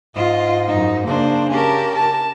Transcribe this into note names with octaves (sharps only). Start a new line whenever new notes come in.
G#2 F4 D#5
F#2 D#4
C#3 A#3 D4 C5
C#4 G4 A#4 A5
A5